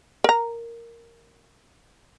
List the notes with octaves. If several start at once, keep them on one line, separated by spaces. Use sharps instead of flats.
A#4 A#5